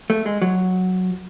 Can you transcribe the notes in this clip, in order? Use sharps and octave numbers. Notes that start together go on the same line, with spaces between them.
A3
G#3
F#3